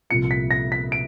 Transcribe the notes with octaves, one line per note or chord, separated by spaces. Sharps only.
C2 A#2 F3 C#7
B6
A#6
B6
D7